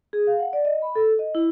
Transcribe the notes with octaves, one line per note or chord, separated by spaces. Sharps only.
G#4
F5
F#5
D5
D#5
B5
A4
D#5
E4